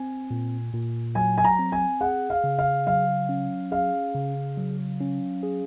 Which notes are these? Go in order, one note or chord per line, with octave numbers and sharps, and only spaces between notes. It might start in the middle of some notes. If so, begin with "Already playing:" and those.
Already playing: C4 G#5
A#2
A#2
F#3 G#5
G#5
A#5
C4
G#5
G#4 F#5
F5
C#3
F5
F#3 F5
C#4
G#4 F5
C#3
F#3
C#4
G#4